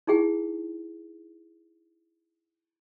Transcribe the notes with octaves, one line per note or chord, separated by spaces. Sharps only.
D#4 E4 G#4 G5